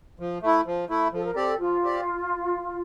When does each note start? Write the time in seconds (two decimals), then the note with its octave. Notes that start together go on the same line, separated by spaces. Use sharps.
0.20 F3
0.43 A3 E4
0.66 F3
0.89 A3 E4
1.12 F3 A4
1.24 A#4
1.35 C4 G4 A4 D5
1.59 F3 F4
1.82 C4 G4 D5